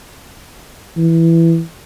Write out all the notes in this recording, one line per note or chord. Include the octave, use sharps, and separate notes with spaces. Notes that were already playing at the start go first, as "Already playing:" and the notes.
E3